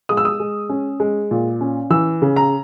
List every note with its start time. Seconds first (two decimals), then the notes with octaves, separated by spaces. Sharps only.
0.09 G#3 D#6
0.17 E6
0.25 D#6
0.40 G#3
0.69 C#4
1.00 G#3
1.31 A#2
1.61 C#4
1.90 E3 E6
2.22 C#3
2.36 A#5